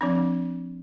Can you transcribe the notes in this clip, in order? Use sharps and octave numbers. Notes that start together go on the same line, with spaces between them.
F3 C4 D4